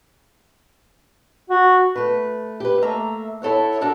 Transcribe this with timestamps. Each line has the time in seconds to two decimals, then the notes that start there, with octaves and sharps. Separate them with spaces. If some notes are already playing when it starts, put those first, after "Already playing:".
1.50 F#4
1.96 A3 B4
2.60 G4 B4
2.82 A3 A#3 E5 A#5
3.42 E4 A4 C#5 F#5
3.81 D4 F#4 A4 A#4